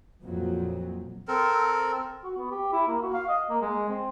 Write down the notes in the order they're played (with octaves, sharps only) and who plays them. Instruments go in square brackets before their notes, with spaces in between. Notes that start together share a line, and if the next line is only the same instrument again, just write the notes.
[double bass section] A#1 F2 A#2 F3 F#3
[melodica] C4 A4 A#4
[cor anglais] F#4
B3
G4
E4
A#3
F#4
F5
D#5
A#3
G#3
C4